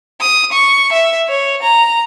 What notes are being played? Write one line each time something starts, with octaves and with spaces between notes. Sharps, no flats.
D#6
C#6
E5
C#5
A#5